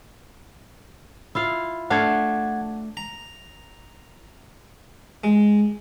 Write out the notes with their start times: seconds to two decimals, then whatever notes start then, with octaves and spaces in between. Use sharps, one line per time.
1.35 E4 F4 F5
1.90 A3 D4 F5 F#5 A5 G#6
2.97 A#5
5.24 G#3